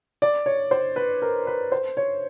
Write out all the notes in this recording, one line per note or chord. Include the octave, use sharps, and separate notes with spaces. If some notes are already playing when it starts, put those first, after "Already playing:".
D5
C#5
C5
B4
A#4
B4
C5
C#5